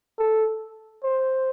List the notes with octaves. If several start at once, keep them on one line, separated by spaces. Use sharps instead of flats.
A4
C5